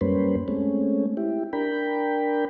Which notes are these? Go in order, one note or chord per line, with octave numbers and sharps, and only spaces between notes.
F#2 G3 A#3 C#4 B4 C5
G#3 A3 C4 C#4
E4 G4
D4 A#4 G5 B5